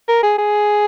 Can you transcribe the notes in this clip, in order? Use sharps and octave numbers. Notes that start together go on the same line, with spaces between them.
A#4
G#4
G#4